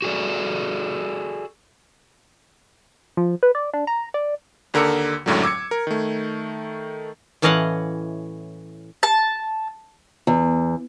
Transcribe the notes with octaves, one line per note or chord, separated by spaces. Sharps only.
F#4 G#4 A4 D5
F3
B4
D5
D4
A#5
D5
D#2 D3 A#4 D6 E6 C#7
G#1 C#2 F#2 A2 D3 F#3
D6 E6 G#6 C#7
A#4
D#3 A3
A2 E3 C#4 D#5 F5 F#5
A5
E2